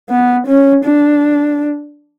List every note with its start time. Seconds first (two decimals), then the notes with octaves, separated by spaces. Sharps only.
0.10 B3
0.47 C#4
0.85 D4